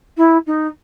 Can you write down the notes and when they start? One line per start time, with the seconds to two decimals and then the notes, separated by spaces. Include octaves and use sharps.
0.17 E4
0.46 D#4